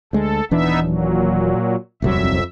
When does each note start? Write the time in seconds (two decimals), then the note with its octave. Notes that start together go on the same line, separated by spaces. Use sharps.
0.13 D2 G#3 A4
0.51 D#1 E3 B3 D4 D#4 E5
0.81 A#2 F#3
2.02 D#1 C2 F2 F#3 E5